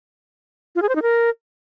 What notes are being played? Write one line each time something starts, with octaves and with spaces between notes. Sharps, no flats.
F4
G#4
C5
D#4
A#4